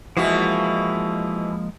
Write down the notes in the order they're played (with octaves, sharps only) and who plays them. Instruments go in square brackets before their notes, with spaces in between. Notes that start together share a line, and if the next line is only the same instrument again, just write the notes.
[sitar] B2 E3 F#4 [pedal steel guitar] F3 G#3 A#3